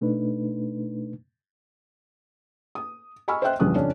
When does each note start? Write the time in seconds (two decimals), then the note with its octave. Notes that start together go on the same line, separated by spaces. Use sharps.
0.01 B2 A3 D4 D#4 B4
2.75 D#6
3.28 D#5 G#5 B5 C#6 E6 F6
3.42 C5 D#5 E5 G5 F#6
3.60 A#1 E2 G2 C#3 D#6 F#6
3.75 F2 C#3 C#4 D4